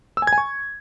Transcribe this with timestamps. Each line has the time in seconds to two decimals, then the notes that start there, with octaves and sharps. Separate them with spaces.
0.17 E6
0.22 G#5
0.27 G#6
0.33 G#5
0.38 C#6